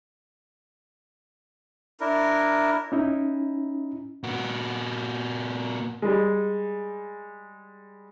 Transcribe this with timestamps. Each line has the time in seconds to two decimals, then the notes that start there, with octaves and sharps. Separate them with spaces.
2.00 D4 E4 A#4
2.92 C#4 D#4 E4
4.24 A#2 F#4
6.02 G3 G#3